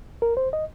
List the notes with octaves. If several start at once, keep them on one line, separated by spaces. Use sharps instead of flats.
A#4
C5
D#5